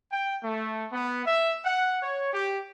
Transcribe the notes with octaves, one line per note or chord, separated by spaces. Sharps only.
G5
A3
B3
E5
F#5
C#5
G4